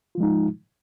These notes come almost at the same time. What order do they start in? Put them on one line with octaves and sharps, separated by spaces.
F4 F3 G#3 D#4